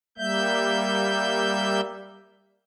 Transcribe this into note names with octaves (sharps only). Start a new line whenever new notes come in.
G3 A#3 E5 G6